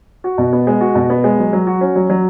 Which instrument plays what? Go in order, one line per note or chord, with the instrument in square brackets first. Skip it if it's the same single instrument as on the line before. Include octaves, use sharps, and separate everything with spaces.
[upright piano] F#4
B2
B3
G#3
F#4
B2
B3
G#3
F#3
F#3
F#4
C#4
F#3
F#3